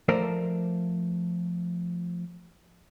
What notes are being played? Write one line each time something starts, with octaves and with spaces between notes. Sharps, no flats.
F3 A3 A#4 C5 D5